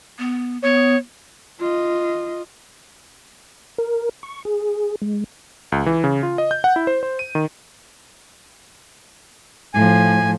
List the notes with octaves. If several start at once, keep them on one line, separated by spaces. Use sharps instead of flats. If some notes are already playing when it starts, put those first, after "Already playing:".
B3
B3 C#5
F4 D#5
A#4
C#6
G#4
G#3
C#2
E3
C#3
F4
D#5
G6
F#5
E4
C5
C5
D#7
D#3
A2 F3 G#5